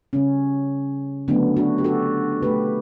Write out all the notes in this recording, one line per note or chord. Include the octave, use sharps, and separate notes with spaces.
C#3 G3 C#4
D3 F#3 A3 B3 D4
D4 F#4
G4
F#4 A4
B2 A3 G4 B4